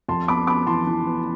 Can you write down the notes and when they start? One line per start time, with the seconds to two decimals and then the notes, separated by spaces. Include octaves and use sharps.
0.09 F2 A5 C6
0.28 B3 B5 D6
0.47 B3 B5 D6
0.67 E3 A5 C6
0.87 E3
1.07 B3